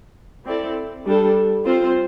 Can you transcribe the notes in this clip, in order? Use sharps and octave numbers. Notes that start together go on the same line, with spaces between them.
C4 E4 A4 D5
G3 D4 A4
C4 F4 C5